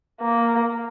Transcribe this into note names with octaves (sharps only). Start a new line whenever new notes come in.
A#3